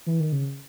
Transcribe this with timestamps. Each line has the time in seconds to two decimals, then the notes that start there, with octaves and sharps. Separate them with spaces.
0.06 E3
0.20 D#3
0.32 C#3